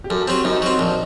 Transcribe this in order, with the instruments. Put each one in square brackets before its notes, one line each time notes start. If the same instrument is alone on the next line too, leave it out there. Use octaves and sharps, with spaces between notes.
[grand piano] G4
[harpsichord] F#2 [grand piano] A4
[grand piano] A4
[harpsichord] F#3 C4 [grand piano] G4
[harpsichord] F#2 [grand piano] D#4
[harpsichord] F#3 C4
A#1